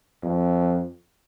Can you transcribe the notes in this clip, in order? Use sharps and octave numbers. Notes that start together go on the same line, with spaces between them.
F2